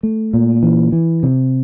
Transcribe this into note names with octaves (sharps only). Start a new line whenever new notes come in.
A3
A#2
E3
E3
C3